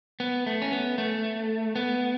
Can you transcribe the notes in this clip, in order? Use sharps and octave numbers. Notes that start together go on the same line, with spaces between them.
B3
A3
C#4
B3
A3
B3